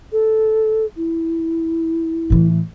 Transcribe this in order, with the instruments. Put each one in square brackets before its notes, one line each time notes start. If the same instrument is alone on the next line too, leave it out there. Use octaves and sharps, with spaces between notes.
[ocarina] A4
E4
[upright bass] A2 E3